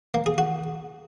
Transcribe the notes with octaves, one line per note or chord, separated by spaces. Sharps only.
A#3
G#4
F#4